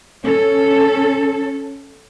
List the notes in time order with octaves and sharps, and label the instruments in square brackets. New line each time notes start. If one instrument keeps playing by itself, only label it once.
[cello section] C#4 A4